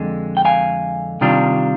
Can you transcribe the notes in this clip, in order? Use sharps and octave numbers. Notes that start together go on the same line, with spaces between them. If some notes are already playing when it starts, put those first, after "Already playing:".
Already playing: F2 D3 G#3
G5
F5 G#5
C3 D#3 G3 D4 F4